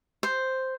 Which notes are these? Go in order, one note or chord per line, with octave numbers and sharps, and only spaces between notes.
C5